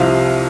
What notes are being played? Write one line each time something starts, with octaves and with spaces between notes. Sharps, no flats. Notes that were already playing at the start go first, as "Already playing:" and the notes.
Already playing: C2 C3 F3 F5